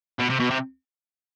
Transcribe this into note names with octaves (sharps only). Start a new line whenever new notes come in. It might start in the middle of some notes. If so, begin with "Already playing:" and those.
B2
C3
B2
C3